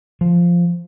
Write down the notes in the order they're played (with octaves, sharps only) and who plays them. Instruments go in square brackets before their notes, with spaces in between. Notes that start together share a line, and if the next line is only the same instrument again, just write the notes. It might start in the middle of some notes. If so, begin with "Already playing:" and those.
[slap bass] F3